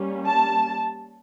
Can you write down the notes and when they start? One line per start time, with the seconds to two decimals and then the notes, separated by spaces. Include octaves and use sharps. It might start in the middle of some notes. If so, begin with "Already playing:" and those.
Already playing: G3 A#3 C#4
0.26 A5